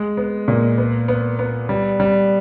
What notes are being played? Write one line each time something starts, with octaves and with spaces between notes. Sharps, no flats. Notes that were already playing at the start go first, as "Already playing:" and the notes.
Already playing: G#3
B3
A#2
B3
B3
B3
G3
G3